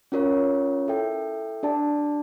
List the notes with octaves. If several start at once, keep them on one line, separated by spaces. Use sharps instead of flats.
C#4 F4 A#4 C#5
E4 A4 E5 G5
D4 G4 D5 A5